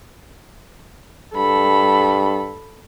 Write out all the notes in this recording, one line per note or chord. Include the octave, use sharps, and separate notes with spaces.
G2 A4 B5